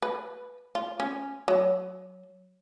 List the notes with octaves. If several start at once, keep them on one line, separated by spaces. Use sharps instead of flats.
B4
F4
C#4
F#3